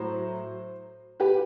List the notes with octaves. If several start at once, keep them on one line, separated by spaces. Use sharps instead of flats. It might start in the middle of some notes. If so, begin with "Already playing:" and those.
Already playing: A2 F#3 C5
G4 B4